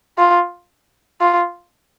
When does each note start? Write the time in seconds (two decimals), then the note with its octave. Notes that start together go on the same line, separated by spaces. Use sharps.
0.18 F4
1.21 F4